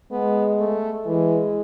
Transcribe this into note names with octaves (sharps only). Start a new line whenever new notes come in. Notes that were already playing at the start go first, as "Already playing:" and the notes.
G#3 B3
A3
E3 G#3